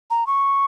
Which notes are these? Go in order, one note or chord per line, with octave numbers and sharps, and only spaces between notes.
A#5
C#6